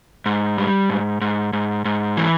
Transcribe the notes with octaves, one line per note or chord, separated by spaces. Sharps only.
G#2
G3
G#2
G#2
G#2
G#2
E3